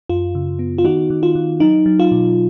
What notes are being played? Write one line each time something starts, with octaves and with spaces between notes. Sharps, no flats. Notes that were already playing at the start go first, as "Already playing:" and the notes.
F#2 F4
C#3
B3
F4
D#3 D#4 F#4
D#3
F4
D#3
F#3 D#4
F#3
F4
B2